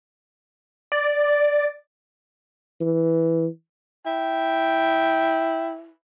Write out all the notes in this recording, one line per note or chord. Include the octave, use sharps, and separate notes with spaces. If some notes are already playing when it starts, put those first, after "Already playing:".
D5
E3
E4 G5